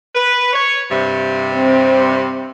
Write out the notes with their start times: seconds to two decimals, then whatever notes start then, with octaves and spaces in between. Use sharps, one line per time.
0.15 B4
0.53 C#5
0.91 G2 C3
1.55 C4